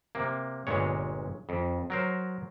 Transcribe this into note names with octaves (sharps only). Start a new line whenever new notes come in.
C3 A#3
G1 A#2 G#3 C#5
F2
F#3 A#4 C5